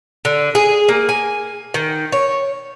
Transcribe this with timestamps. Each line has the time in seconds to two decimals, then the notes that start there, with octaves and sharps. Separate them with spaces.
0.25 D3
0.55 G#4
0.89 A#3
1.09 G#5
1.74 D#3
2.12 C#5